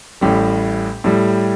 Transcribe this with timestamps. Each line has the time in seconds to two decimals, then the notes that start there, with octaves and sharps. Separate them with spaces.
0.21 A1 A2 G3 G4
1.04 A2 G3